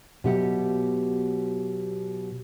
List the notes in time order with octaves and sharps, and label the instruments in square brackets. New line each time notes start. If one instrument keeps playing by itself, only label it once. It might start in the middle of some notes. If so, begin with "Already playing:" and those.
[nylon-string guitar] B2 F#3 G4 E5 F#5